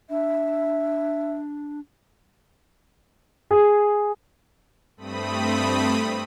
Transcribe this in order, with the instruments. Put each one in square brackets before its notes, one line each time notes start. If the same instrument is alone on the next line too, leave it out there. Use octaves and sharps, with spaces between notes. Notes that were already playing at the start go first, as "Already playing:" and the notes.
[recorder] D4 [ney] E5
[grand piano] G#4
[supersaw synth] G2 A3 C4 B5 D#6